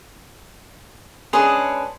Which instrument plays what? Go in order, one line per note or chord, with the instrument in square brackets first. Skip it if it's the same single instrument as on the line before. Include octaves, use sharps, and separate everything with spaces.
[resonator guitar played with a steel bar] G#3 C#4 D4 [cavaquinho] G#4 B4 [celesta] G#5 C6 F7